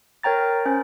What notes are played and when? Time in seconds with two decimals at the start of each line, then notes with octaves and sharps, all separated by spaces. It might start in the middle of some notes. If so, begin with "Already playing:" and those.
0.23 A#4 C#5 G5 A#5 A6
0.66 C#4 C5